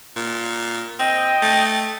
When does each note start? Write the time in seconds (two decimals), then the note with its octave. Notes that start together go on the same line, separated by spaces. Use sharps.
0.16 A#2
0.99 C4 D#5 G5
1.42 A3